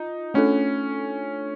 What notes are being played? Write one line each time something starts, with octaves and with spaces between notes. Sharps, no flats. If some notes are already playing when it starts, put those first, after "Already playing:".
Already playing: D#4 F4
A3 C#4 D4 F4 A4